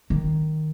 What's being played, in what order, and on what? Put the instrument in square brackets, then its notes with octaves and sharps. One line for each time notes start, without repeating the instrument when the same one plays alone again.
[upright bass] D#3